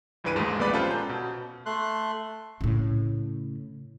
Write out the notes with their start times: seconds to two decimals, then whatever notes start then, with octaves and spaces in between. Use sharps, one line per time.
0.24 C#2 G2 E3 B4 D7 D#7
0.36 D#2 G#2 G#3 A3
0.59 A#1 B3 B4 D5 B5
0.73 C#4 F4 G4 A4 B4 C5
0.91 A#5 G6
1.09 B2
1.66 A3 C6 F#6
2.61 A2 C#3